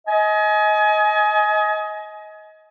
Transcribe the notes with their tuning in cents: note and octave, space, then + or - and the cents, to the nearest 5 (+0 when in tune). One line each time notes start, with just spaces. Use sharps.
D#5 +25 G#5 +30